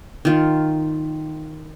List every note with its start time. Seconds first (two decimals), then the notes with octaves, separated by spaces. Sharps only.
0.25 D#3 F4